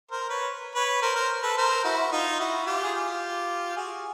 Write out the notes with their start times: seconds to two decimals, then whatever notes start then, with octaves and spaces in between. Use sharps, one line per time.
0.11 A#4 C5
0.30 B4 C#5
0.75 B4 C#5
1.02 A#4 C5
1.16 A#4 C5
1.43 A4 B4
1.57 A#4 C5
1.84 E4 F#4
2.12 D#4 F4
2.40 E4 F#4
2.66 F4 G4
2.83 G#4
2.94 F4 G4
3.76 F#4 G#4